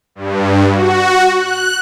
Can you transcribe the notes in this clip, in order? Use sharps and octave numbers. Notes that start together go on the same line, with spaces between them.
G2
F#4
F#6